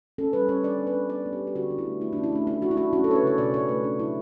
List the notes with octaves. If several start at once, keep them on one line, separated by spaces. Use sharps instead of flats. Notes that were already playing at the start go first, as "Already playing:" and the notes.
C#4 A4
G3 B4
C#4 C#5
D4 D5
B3
B4
D4
B3 D5
B3
G4
G3
G4
D3 F#4
D4
E4
A3
A3 E4
D4
C#4
E4
A3 D4
D4 E4
D4 F#4
E4
D4 F#4
C#4 F#4
A4
C#4 C#5
B4
C#3 C#5
B2 D5
B2 C#5
A3 B4
C#4 D4
F#3 E4